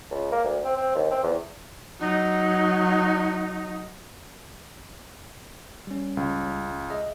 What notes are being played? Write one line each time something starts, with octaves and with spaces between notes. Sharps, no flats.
C#2
A#3
D2
C4
C4
D#2
C4
E2
F#3 D#4
G3 C#4
C#2
G#4 D#5 E5